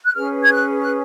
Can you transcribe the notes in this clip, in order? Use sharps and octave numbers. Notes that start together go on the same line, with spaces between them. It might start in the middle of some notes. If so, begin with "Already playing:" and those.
F#6
C#4 G#4 B4 F6
G#6
F#6
F#6